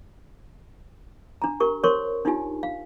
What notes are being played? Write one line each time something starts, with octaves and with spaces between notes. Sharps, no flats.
D4 A#5
G4 A#4 C#6
A#4 C5 C#5 C6 C#6
D4 D#4 F4 G4 G#5
F5